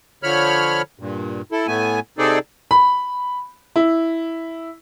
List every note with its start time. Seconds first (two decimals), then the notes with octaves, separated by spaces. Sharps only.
0.23 D3 F3 C#5 B5 F6
0.99 G2 A#2
1.52 E4 A4
1.67 A2 A3 B3 G#5
2.18 C3 C4 D#4 G#4 A4 D5
2.71 B5
3.76 E4